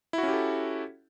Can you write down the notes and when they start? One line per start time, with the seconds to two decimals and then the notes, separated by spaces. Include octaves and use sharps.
0.13 E4
0.18 F#4
0.23 C#4
0.28 G4
0.33 A4